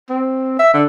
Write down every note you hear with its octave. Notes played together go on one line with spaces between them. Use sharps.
C4
E5
D3